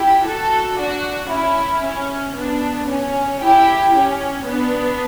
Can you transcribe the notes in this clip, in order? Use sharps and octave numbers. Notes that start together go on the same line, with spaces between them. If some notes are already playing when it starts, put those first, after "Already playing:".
Already playing: E4 G4
F#4 A4
D4 F#4
C#4 E4
C#4
B3 D4
C#4
E4 G4
C#4
B3 D4